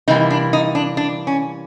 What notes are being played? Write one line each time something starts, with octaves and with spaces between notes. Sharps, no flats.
C3 E3 G3 A#3 D#4
D4
D#4
D4
D4
C#4